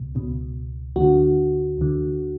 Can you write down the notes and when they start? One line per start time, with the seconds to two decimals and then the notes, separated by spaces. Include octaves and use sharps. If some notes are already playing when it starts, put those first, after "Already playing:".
Already playing: C#2 B2
0.15 C#2 B2
0.96 D2 D3 F#4
1.78 D2 D3